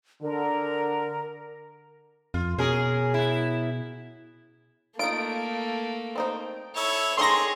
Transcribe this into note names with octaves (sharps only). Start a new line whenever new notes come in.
D3 A#4
F2 F4
B2 C#4 G#4 A#4
B3 E4
A3 A#3 D#4 F4 D7
C4 D#4 C5
E4 A4 C#5
A3 C4 D#4 G#4 A#4 C#5 C6 A#6